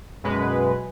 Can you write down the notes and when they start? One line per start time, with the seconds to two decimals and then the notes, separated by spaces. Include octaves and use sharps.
0.24 F#2 B2 G#3 B4